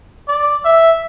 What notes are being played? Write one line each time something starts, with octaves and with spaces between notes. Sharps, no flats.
D5
E5